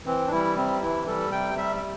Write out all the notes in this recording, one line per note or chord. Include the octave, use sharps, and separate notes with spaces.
E3 C4
D4
G3 E4
C3 C4
E3 E4
G3 A4
C3 G5
G3 E5
E5
C3